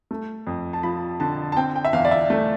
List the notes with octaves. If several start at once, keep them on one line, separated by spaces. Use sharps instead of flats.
A3
F2
A5
F3 B5
D3 A5
A5
C4 G5
G5
E5
E2 F5
D5
E5
A3